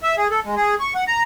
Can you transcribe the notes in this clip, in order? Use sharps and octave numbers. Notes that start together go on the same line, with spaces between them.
E5
G#4
A4
G#3
G#4
C#6
F#5
A#5